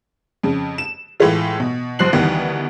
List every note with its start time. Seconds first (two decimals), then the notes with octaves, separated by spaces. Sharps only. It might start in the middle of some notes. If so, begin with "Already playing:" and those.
0.43 F2 C#3
0.78 E7
1.20 A2 E3 G#3 A3 F4
1.60 B2
1.99 F#1 F3 C5 F#6 C7 F#7
2.13 D2 D#3 E3 G3 B3